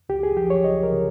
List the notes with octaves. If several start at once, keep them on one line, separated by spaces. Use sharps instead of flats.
C#2 G4
G#4
F3 G4
C#5
C#2 D#5
A#4
C#3